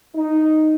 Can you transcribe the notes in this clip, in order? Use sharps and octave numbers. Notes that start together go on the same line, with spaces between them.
D#4